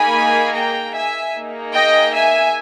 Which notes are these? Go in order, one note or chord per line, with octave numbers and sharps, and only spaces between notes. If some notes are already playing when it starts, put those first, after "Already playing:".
Already playing: A#3 D#4 G#4 G#5 B5
G5 A#5
E5 G#5
A#3 D#4 G#4
D#5 G5
E5 G#5